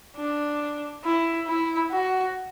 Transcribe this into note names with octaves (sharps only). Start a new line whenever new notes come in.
D4
E4
E4
F#4